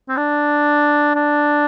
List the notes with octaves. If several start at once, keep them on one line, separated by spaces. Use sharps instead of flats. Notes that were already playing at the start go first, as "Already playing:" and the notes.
C4
D4
D4